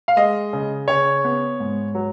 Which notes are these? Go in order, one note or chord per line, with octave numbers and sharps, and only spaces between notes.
F5
G#3 D#5
C#3
C#3 C#5
B3
G#2
F#3